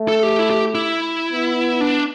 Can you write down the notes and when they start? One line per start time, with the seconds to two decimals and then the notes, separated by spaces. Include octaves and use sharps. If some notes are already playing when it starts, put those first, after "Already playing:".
Already playing: A3
0.08 A4
0.23 G4
0.39 E4
0.51 G4
0.75 E4
1.32 B3
1.81 D4